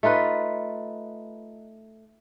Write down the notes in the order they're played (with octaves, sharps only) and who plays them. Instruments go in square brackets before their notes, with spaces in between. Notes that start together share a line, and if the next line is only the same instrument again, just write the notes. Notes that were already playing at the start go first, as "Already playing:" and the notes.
[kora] A3 D#4 F4 B4